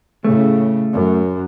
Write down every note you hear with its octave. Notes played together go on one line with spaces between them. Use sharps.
A2 C#3 A3
F#2